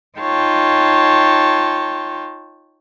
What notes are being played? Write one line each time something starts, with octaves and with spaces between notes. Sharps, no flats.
D#4 F4 C#5 G5 A5